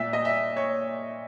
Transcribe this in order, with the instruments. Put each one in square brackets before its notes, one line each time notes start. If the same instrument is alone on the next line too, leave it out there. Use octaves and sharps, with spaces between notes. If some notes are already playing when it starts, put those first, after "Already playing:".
Already playing: [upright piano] A#2 E5
D#5
E5
C#5